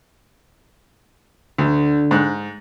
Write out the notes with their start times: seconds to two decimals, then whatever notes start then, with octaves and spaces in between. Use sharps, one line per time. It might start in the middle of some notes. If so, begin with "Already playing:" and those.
1.58 D2 D3
2.11 G#2 F#6